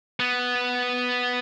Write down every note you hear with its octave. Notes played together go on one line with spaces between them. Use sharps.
B3